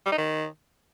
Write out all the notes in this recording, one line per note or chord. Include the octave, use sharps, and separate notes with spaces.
G3
D#4
D#3